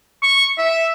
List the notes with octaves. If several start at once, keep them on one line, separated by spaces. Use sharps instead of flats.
C#6
E5